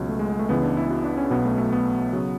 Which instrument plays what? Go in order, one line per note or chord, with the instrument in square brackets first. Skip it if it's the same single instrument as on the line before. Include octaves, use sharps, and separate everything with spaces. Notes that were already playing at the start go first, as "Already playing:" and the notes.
Already playing: [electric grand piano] C#2 B2 F#3 C#4
A3
G#3
G#3
A3
C#2 C#3 E3 B3
D4
E4
F#4
D4
C#4
B1 B2 F#3 B3
A3
A3
B3
C#3 F#3